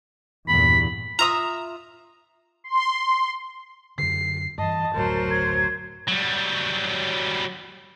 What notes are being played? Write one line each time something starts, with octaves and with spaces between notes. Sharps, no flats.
E2 G2 A#2 B5
F4 E5 A#5 D#6
C6
F#2 D3 C7
G2 E3 D#5 A5
F#1 D2 A2 F#3 A#4 C5
G#6
F#3 G3